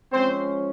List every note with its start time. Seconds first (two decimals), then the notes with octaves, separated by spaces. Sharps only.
0.12 F3 G#3 C4 C#4 C5